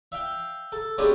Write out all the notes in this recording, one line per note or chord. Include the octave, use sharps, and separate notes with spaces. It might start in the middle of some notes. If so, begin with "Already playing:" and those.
E5 F5 G5
A4
G#3 B3 C#4 D4 F4 G4